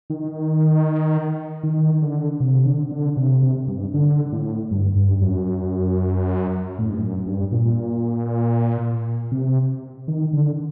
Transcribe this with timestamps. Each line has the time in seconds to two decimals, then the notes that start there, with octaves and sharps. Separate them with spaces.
0.10 D#3
1.63 D#3
2.02 D3
2.40 C3
2.65 D3
2.91 D3
3.17 C3
3.43 C3
3.68 G2
3.94 D3
4.32 A2
4.71 G2
4.96 G2
5.22 F#2
6.79 A2
6.90 G2
7.01 F#2
7.26 G2
7.52 A#2
9.31 C3
10.08 D#3
10.33 D3